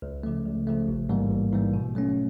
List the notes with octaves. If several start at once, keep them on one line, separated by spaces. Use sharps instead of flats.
C#2
C#3 F3 A3
C#2
C#3 F3 A3
A1
G#2 E3 G3 A#3
A1
G#2 E3 G3 A#3
B2
F#3 A3 C#4